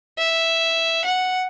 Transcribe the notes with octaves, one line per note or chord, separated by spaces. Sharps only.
E5
F#5